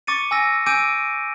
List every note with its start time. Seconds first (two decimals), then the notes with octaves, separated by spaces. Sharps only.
0.07 C#6 D6 A6 C#7 D#7
0.31 G#5 E6 A#6
0.66 G#5 D6 E6 G6 D7 D#7